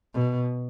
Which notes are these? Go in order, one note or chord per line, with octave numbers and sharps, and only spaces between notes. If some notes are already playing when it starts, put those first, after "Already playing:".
B2